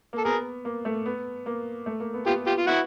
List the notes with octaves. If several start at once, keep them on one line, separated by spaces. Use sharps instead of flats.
A#3 A4
B3 G#4 A#4
A#3
A3
B3
A#3
A3
A#3
B3
B3 F4 G4
F4 G4
F4
B3 E4 F#4